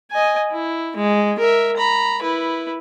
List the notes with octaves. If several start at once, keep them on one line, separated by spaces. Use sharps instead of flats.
D#5 G#5
E4
G#3
A#4 E5
A#5 B5
E4 B4